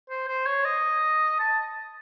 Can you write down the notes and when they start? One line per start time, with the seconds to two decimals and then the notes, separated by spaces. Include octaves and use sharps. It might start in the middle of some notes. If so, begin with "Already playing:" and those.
0.10 C5
0.28 C5
0.46 C#5
0.65 D#5
1.39 A5